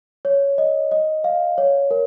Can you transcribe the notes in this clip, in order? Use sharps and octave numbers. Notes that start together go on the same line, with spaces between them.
C#5
D#5
D#5
F5
C#5
A#4